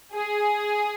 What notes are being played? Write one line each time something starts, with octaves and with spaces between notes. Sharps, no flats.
G#4